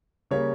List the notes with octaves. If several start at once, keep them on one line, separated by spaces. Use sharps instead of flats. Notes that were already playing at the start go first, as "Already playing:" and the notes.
C#3 G3 A#3 C#5